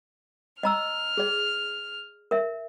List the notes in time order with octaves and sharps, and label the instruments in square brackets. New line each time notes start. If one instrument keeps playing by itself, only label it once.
[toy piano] D#5 A#5 E6 [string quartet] F6
[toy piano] G#4 D5
A#4 E5